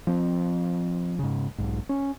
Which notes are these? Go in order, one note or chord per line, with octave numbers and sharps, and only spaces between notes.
F3 C4
G#2 C#3
B1 G#2
C#4